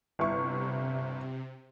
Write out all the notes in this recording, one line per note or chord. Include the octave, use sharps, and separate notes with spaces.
G1 C3 E4 C#6